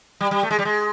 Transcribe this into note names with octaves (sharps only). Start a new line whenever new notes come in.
G3
G3
A3
G#3
G3
G#3